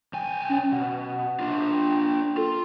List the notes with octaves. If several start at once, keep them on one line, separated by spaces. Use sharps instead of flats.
B1 G5 G#5
C#4
B2 F#5
D4 F4
G5
F4 A4